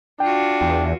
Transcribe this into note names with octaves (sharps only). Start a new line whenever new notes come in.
D4 F4 F#4 G5
E2 G5